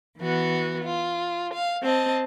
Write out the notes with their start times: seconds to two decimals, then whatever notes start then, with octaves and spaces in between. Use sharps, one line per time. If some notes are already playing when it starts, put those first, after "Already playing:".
0.19 E3 B3 F#4
0.84 F4
1.54 F5
1.83 C4 D#5 A5